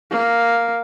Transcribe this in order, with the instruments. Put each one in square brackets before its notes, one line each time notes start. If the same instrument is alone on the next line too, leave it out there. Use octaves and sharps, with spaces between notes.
[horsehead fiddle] A#3